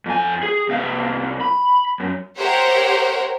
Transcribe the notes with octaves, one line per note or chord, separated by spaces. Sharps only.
F2 G#5
G#4
C2 F5
B5
F#2
G4 A#4 C5 C#5 E5 F#5